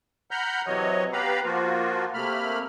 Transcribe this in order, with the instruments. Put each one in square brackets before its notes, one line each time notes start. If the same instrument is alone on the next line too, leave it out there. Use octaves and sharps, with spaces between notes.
[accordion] F#5 A#5 B5 F6 G6
C3 E3 F#3 C#5 D#5
B3 G4 B4 F5 A#5 B5
F3 A#3 F4 F#4
C3 A3 A#3 B5 F6